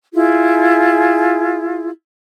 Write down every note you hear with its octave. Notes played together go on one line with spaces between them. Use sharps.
E4 F4 G#4